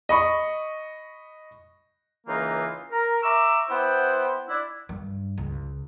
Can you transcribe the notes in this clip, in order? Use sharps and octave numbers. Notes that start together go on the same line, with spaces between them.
D#5 B5 C#6
C#2 E3 A#3 D#4 F4
A#4
E5 A#5 C#6 D6 E6
B3 E4 C5 F#5 G5
D4 E4
G2
C#2